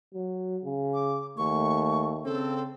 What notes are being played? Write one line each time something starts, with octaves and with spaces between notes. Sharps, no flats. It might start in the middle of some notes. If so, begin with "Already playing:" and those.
F#3
C#3
D6
D#2 A3 C#6
C#3 C4 A4